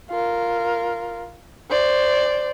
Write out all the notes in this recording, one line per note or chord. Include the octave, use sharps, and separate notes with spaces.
F4 A#4
C5 D5